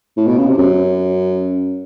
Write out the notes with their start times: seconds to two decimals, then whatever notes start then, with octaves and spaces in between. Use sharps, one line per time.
0.17 A2
0.27 B2
0.38 C#3
0.48 C3
0.58 F#2